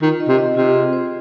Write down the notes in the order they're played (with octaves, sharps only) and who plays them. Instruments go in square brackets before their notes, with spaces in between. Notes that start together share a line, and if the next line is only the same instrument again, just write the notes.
[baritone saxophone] D#3 [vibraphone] F4
[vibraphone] D#5
[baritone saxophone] C3
[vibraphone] D#5
[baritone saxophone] C3 [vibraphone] F4
[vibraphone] G#4
C5